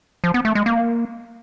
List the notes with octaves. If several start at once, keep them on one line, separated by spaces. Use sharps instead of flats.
F3
B3
A3
G#3
A#3